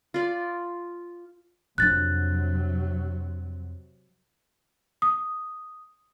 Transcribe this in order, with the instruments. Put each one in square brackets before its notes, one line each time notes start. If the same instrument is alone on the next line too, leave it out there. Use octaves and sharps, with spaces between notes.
[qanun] F4 D5
[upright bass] F2 D4 [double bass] C3 F#3 [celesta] F#6 A6
[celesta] D#6